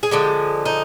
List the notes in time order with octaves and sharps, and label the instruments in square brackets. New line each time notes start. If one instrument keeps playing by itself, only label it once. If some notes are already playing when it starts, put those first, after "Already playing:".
[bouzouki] G#4
D3 F3 G#3 G4
D#4